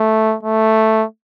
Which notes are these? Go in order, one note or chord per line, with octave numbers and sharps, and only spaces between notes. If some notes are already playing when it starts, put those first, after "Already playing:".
Already playing: A3
A3